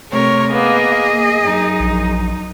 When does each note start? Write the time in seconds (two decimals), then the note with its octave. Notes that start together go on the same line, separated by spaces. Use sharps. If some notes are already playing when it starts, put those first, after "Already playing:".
0.10 C3 A3 A#4 C#5
0.52 A#3 B3 G#4 D#5
1.10 A#3
1.41 F#2 D#4
1.80 A#1